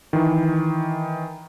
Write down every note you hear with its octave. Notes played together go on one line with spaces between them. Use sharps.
D#3 E3